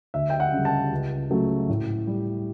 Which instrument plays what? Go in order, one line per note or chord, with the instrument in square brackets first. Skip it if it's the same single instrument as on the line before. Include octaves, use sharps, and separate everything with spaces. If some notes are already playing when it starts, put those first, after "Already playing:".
[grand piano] D2 E5
G5
F#5
C#3
G3
A5
C#2
C#3 F#3 A3
A2
G3